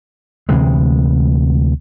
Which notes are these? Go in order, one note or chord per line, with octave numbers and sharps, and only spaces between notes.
D2 C3 E3 G#3